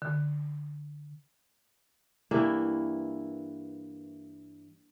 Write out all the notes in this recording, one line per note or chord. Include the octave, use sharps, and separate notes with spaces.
D3
G2 E3 A#3 E4